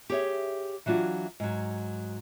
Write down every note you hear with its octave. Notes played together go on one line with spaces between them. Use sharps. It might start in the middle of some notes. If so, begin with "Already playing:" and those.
G4 G#4 C#5 E5
E3 F#3 D4 F4 F#4
G#2 F#3